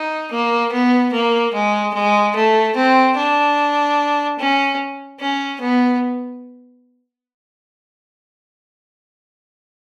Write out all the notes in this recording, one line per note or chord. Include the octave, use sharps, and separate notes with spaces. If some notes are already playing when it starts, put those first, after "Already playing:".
Already playing: D#4
A#3
B3
A#3
G#3
G#3
A3
C4
D4
C#4
C#4
B3